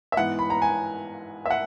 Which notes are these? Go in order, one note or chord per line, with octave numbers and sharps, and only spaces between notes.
E5
G#2 E3 B3 F#5
B5
A#5
G#5
E5
F#5